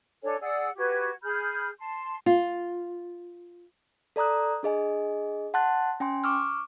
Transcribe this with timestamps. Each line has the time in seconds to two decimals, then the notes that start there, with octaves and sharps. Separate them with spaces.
0.23 D4 A4 C#5 G#5
0.41 G#4 D5 F#5 E6
0.76 F#4 G4 B4 G#6
1.23 G#4 B5 F6 G6
1.78 A5 C6
2.26 F4
4.16 A4 D5 A#5 D#6 F#6
4.63 D4 G#4 D#5 G#5
5.54 F#5 A5 C6 F#6 A6
6.00 C#4 G5 G#5 C6
6.24 C#6 D6 E6 F6